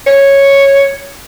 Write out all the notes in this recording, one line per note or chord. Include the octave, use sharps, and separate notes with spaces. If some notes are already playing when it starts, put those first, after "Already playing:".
C#5